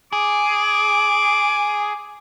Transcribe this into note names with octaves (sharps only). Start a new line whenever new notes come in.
G#4 D6